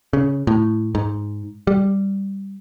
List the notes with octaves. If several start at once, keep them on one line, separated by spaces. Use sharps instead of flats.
C#3
A2
G#2
G3